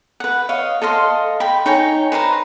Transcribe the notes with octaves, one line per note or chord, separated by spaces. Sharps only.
B4 F#5
C#5 D#5 F5
A4 D#5 F5 C6
G5 B5
D#4 C#5 G5 G#5
B4 C5 E5 A#5